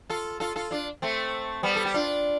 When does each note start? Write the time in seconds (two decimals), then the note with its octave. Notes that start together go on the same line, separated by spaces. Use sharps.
0.10 F4 A4
0.40 F4 A4
0.56 F4 A4
0.71 D4 F4
1.02 A3 C4
1.63 G3 B3
1.76 A4
1.85 G4
1.94 D4 F4